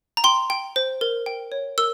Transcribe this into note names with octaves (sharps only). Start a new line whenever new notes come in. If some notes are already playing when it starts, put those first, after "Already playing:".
A#5
G5 C6
G5
C5
A#4
G5
C#5
A#4 E6